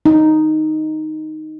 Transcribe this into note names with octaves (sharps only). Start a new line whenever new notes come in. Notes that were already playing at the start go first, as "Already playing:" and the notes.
D#4